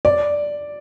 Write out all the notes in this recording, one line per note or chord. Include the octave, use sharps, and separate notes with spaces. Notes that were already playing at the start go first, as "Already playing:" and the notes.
D5